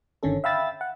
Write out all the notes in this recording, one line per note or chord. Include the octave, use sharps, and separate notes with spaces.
G1 D3 D#3 C#4 A4
E5 F5 G5 B5 E6 A6
F#5